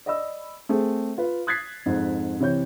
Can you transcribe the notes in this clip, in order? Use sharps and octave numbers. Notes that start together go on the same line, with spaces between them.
D5 D#5 B5 E6
A3 C4 G#4
F4 B4
D#6 F#6 G#6 A6 B6 C7
F2 G#2
C3 E3 C#5 G6